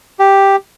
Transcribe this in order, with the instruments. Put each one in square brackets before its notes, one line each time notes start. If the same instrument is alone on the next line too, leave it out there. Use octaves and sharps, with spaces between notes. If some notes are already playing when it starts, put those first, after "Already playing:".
[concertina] G4